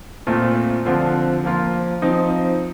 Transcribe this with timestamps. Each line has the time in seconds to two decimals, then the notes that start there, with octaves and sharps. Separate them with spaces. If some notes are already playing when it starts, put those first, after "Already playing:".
0.27 A#2 A3 C4 F4
0.85 D3 F3 C4 F4
1.44 F3 A#3 F4
2.02 F3 C4 D#4